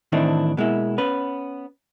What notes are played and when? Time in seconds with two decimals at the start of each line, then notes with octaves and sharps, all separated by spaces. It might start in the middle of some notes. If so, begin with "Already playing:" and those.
0.12 A2 D#3 E3 C4 D4 E4
0.57 B2 G#3 A#3 E4
0.98 B3 C#4 B4